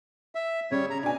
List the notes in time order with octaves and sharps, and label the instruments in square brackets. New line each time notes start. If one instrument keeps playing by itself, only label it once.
[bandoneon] E5
[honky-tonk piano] C#3 [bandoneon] G3 C#5
[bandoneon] A#5
[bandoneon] B2 [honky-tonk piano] D4 G#5